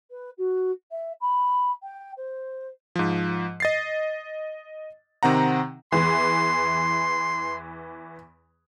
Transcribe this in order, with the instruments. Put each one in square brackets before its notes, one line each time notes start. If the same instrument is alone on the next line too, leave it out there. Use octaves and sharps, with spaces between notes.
[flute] B4
F#4
E5
B5
G5
C5
[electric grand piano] G#2 F3
D#5 A6 C7
C3 D#3 C4 F#5 A#5
[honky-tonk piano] E2 E3 [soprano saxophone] C6